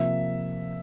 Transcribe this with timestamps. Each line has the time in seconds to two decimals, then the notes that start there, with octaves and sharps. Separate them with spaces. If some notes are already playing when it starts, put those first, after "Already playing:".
Already playing: C3 F3 A#3 E5